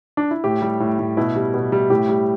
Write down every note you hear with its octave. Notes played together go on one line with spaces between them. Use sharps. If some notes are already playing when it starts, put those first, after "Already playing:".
D4
E4
A2 G4
G3
A2
A2
B2 E4
G3
B2
G3
A2 G4
G3